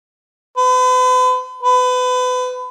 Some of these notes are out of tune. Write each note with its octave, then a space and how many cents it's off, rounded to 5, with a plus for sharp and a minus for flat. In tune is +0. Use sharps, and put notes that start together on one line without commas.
B4 +40
B4 +30